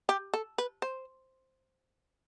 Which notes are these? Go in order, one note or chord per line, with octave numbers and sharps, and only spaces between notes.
G4
A4
B4
C5